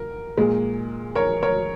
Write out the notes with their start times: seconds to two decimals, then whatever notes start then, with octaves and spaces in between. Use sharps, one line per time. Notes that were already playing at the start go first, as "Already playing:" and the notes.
Already playing: A#4
0.37 A#2 G#3
1.15 A#4 C#5
1.43 A#4 C#5